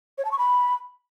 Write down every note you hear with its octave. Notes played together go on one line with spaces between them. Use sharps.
C#5
A5
C#6
B5